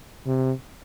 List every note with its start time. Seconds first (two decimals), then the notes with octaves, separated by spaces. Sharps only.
0.27 C3